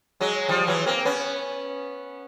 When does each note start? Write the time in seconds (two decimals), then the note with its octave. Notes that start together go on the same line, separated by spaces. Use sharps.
0.20 F#3 G#3
0.49 F3 G3
0.67 E3 F#3
0.86 A#3 C4
1.05 B3 C#4